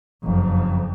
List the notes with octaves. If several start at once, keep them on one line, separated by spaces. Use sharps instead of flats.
F#1 F2